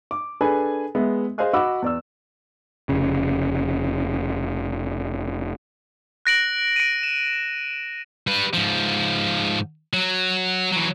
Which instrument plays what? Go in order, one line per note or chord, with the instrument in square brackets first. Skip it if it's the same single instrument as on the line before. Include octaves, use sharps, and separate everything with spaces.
[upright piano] D6
D4 G#4 A4 B4 G#5 B5
G#3 B3 E5
G#4 C5 D#5 F5 G#5 F#6
F#4 D#5 F#5 B5 D6 E6
E2 D5 E6
[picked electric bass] F1 C#3
[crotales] F#6 A#6 D7 F#7
D7 D#7
E7
[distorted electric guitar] G3 B4
G#2 F3
F#3
E3 F#3